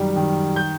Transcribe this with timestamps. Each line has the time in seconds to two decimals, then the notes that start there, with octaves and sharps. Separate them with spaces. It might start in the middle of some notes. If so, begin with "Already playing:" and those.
Already playing: F#2 D#3 G3
0.16 D#3
0.56 G6